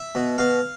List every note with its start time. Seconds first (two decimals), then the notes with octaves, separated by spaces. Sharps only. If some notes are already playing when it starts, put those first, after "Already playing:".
Already playing: E5
0.15 B2
0.38 B2 F5